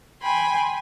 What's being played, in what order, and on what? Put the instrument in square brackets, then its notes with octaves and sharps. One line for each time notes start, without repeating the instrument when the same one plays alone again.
[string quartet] G5 G#5 B5 C6